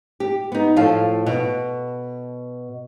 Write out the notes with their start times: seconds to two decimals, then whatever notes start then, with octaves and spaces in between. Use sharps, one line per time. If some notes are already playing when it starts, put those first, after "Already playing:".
0.20 G4
0.52 B3 D#4
0.76 A2 F3 A4 F5
1.26 B2